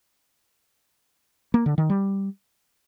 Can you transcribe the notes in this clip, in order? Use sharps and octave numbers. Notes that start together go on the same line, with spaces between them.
A#3
D3
D#3
G3